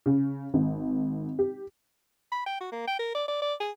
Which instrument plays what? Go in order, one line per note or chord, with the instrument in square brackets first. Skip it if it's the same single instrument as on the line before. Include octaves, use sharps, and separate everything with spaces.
[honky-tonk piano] C#3
G#1
G4
[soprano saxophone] B5
G5
F#4
A#3
G5
A#4
D5
D5
D5
G#4